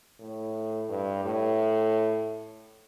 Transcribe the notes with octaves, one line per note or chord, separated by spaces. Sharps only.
A2
G2
A2